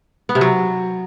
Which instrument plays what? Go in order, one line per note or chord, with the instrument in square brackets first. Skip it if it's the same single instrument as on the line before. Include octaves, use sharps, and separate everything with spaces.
[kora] B3
C3
F#3